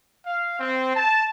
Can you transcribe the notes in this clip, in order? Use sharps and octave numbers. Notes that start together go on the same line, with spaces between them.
F5
C4
A5